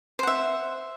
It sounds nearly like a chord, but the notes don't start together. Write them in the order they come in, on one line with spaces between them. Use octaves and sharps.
C5 F#5 E5